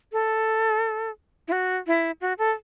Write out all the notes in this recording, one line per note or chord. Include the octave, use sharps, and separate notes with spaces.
A4
E4
F#4
E4
F#4
A4